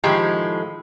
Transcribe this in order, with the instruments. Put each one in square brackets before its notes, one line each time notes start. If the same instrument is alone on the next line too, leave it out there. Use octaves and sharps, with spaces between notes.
[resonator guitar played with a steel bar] A2 D#3 F3 G#3 G4